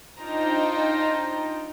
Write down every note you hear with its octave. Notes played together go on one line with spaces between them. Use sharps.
D4 D#4 F4 C5 G5 A#5